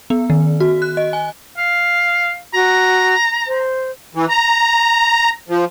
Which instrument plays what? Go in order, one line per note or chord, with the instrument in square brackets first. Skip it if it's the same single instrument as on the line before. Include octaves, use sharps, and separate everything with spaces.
[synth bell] B3
D#3
F#4
F#6
D#5
G#5
[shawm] F5
[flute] F#4 [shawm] A#5
[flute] C5
[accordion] E3
A#5
F3